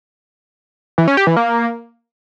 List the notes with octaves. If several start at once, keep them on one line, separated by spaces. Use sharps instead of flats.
E3
C#4
G4
E3
A#3